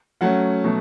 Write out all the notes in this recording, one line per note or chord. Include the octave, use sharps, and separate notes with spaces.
F#3 A3 C#4 F#5
B2 F#3 A3